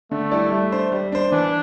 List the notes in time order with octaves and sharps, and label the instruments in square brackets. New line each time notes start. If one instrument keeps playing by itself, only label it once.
[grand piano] D3 [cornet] A3
[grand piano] G3 E4 A4 D5
[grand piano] G3 [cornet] A3
[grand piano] D4 C5
G3
D4 C5
[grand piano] E3 [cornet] D4